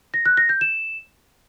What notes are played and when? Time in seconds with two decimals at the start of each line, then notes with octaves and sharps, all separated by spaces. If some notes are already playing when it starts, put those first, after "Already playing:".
0.14 A#6
0.26 F#6
0.37 A#6
0.49 G6
0.61 E7